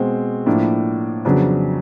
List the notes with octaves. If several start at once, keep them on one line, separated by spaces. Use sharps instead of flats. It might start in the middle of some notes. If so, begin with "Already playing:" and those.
Already playing: B2 G#3 C4
A2 F3 A#3 D4
F2 C#3 F#3 B3 D4